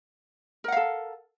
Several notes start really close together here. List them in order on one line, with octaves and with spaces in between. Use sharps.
A#4 F#5 F5 A4